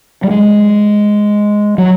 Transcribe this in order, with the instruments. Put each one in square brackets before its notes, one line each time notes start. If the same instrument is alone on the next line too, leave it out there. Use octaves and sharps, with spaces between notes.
[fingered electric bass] G3
G#3
F#3